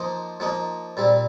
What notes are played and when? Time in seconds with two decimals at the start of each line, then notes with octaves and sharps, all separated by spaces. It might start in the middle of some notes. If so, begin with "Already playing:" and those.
Already playing: F3 A#3 D#4 C5
0.40 F3 A#3 D#4
0.97 A#2 G3 C4